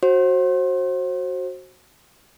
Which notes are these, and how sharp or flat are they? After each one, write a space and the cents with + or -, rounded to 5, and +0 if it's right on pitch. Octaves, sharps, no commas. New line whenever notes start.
F#4 +0 C5 +30